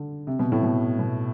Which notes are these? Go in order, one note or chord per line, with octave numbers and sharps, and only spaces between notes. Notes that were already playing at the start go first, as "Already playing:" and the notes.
Already playing: D3
C3
B2
A2
B2
B2